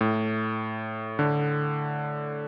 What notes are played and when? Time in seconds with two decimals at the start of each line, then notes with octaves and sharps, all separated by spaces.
0.01 A2
1.19 D3